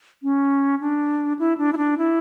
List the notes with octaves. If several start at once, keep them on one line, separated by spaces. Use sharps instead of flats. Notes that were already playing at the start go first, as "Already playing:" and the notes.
C#4
D4
E4
D4
E4
D4
E4